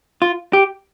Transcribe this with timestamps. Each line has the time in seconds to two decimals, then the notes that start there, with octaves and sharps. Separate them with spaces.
0.22 F4
0.53 G4